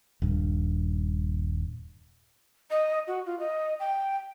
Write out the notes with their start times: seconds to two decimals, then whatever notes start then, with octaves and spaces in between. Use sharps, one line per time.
0.22 D#1 G2
2.70 D#5
3.07 F#4
3.26 F4
3.39 D#5
3.80 G5